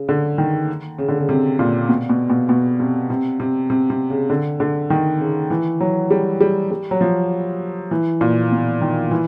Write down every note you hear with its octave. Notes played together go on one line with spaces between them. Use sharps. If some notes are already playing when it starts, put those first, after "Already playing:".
Already playing: C#3
D3
D#3
C#3
D3
C#3
C3
A#2
B2
B2
B2
B2
C3
C3
C3
C3
C3
C#3
D3
D3
D#3
C#3
E3
F#3
G3
G3
G3
F#3
F3
E3
A#2
B2
D#3
E3